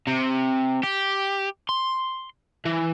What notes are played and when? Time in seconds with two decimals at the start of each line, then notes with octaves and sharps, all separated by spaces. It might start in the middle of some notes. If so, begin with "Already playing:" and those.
0.07 C3
0.83 G4
1.69 C6
2.65 E3